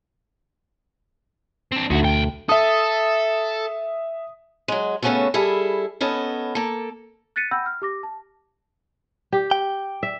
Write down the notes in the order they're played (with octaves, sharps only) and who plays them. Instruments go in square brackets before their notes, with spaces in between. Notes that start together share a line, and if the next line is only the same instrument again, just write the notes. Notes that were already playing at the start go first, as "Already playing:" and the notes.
[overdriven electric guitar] C4 D4
[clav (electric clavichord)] D2 A3 [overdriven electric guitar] D#3 F#4
[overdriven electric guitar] B1 G5
[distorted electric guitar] A4 [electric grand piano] E5 D#6
[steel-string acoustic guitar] F#3 G#3
C#3 A3 B3 C#4 F#4 A4
G3 E4 G#4 A4
B3 C#4 A4 D#5
A#3 A4
[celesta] F#6 A6 B6 C#7 D#7
F#5 G5 B5 E6 G6 A#6
F6
G4 D6 A#6
A5
[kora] G4
[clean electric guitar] G5
[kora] E5